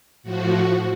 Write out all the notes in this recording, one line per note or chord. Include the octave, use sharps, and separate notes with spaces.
A2 F3 F#4